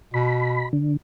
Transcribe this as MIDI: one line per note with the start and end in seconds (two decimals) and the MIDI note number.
0.14 0.68 47
0.14 0.68 83
0.73 0.97 50